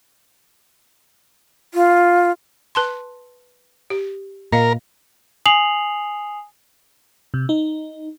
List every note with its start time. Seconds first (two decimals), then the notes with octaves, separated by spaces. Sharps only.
1.74 F4
2.75 B4 A5 C6
3.90 G4
4.52 A#2 A#4 D#5 F5
5.46 G#5 D#6 C7 F7 F#7
7.34 C3
7.49 D#4